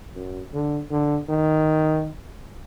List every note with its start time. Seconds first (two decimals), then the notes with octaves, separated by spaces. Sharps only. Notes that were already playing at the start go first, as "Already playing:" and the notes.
0.14 F#2
0.53 D3
0.90 D3
1.29 D#3